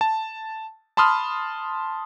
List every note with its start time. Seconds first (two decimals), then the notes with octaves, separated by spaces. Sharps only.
0.01 A5
0.97 A5 B5 C6 D#6 F6